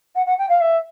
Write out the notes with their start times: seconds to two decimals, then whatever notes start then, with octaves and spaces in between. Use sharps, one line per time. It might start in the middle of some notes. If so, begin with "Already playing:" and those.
0.15 F#5
0.26 F#5
0.38 G5
0.49 F5
0.61 E5